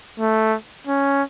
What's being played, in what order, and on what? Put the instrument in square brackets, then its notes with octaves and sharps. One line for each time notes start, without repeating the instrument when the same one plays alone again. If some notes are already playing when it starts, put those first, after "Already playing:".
[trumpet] A3
C#4